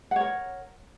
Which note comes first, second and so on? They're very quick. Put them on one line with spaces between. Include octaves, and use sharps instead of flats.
F#5 C#5 A#4